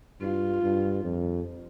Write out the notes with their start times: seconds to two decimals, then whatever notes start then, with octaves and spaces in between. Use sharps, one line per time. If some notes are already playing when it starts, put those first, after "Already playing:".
0.21 G2 F4
0.63 G2
1.04 F2